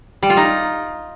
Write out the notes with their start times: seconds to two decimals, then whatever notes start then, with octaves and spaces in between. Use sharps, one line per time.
0.23 G3
0.30 F4
0.37 D#4